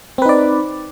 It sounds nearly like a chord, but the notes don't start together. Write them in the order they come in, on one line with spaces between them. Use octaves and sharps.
C4 B4 D#4 D5